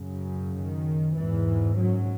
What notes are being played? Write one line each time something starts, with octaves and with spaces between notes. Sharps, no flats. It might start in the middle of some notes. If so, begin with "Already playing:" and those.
Already playing: F#2 C#3
D#3
E2 G#2 E3
F#2 F#3